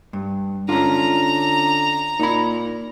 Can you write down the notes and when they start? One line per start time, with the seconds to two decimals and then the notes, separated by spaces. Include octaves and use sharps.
0.13 G2
0.69 D3 C#4 F4 A#5
2.20 A#2 D#4 B5